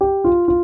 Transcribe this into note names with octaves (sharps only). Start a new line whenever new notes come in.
G4
F4
F4